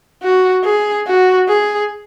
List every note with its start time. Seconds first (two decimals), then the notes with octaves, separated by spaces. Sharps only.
0.23 F#4
0.64 G#4
1.07 F#4
1.48 G#4